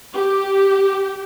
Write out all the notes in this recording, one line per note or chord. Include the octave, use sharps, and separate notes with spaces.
G4